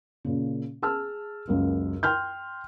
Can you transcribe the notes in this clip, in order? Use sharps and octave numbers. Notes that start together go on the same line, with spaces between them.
A#2 C#3
G#4 A5 E6 F6
C#2 F#2 A#3
G5 C6 F6 G6